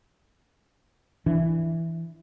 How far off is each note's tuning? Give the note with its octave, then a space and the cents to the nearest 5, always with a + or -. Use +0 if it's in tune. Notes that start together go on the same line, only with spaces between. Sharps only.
E3 +0 D4 +0